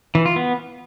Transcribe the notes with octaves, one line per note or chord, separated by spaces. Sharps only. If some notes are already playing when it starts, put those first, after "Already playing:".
E3
F4
B3